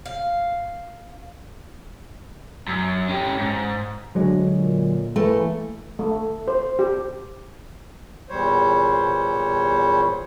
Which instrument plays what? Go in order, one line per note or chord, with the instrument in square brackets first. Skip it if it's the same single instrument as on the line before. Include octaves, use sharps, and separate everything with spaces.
[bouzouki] F5
[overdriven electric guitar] F#2
C#4 G4
G#2
[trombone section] D2 [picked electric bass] D3 F#3 G#3
[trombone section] A#2
[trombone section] E3 [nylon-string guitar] A3 [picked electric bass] A#3
[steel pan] A3
C5
G4
[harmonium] E2 A#2 G3 C5 C#5